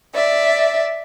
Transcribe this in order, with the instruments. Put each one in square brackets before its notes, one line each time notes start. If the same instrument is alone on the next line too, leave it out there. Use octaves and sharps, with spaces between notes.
[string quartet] D5 E5